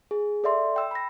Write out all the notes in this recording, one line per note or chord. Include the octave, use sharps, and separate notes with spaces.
G#4
A4 D5 E5 C6
G5 E6
B5 A#6